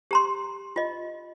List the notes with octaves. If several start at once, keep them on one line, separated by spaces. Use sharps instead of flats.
G4 A#5 C6
F4 D#5